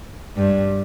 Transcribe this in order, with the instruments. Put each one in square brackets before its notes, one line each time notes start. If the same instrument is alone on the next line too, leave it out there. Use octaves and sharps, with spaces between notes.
[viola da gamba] G2